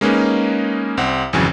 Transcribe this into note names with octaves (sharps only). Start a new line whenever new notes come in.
G#3 A#3 C#4 D#4 G#4 B4
C2 C4 F#5
G#1 F2 C#3 E3 F#3 G#5